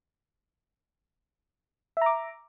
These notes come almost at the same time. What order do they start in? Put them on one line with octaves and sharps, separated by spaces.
E5 A#5 D6